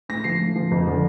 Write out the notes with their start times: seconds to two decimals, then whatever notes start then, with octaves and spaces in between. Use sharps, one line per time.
0.09 A2 A#6
0.24 F3 C7
0.40 A2
0.56 F3
0.71 F2
0.87 D3 F3